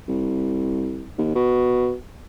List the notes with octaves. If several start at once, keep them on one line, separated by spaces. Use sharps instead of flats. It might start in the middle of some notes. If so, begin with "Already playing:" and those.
C2
D#2
B2